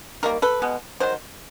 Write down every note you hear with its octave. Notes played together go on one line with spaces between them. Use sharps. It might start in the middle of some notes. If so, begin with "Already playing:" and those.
D#3 G3 A#3 A#4
A4 B4
B2 G#3 B3
D#3 F#3 C5